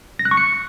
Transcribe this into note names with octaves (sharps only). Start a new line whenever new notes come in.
A#6
F#6
C#6
C#7